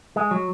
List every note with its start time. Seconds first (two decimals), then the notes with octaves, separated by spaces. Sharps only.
0.16 G#3
0.31 F#3